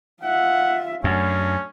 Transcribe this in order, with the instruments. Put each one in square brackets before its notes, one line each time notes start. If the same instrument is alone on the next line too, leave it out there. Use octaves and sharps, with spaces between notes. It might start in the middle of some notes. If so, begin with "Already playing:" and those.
[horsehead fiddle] F4 E5 [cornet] F#5
[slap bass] F#2 [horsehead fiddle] A3 D4 [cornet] C#4